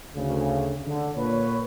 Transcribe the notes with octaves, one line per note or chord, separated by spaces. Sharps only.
D2 C#3
D3
A#2 B4 C#5